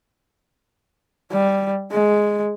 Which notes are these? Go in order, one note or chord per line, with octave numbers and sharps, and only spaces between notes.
G3
G#3